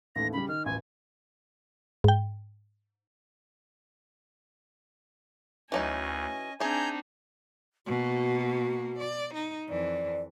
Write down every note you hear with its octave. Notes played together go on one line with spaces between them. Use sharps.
A1 D#2 A3 A#6
C#3 G3 B5
D#3 F6
D#1 A1 G#5
G#2 G5
D2 E3 F#3 C#4 D#4 D#5 G#5
C4 D4 D#4 G#4 E5 G#5 A#5 G6
B2 A#3 F#4
D5
D#4
F2 E3 D5